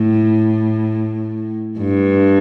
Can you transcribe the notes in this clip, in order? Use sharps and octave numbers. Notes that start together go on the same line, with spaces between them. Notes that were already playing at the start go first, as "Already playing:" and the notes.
Already playing: A2
G2